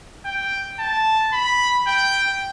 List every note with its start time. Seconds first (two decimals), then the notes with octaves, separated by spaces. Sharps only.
0.25 G5
0.79 A5
1.33 B5
1.87 G5